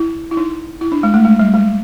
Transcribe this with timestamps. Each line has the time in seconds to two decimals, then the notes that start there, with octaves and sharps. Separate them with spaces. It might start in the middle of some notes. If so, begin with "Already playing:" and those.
Already playing: E4
0.31 E4
0.37 D#4
0.81 E4
0.92 D4
1.03 G#3
1.14 A3
1.25 G#3
1.39 G3
1.54 G#3